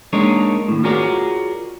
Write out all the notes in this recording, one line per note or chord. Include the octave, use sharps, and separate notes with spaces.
G#3 A#3 D4 D#4 A#4 C#5
D#2 A2
F4 F#4 G#4 A#4 C#5 D5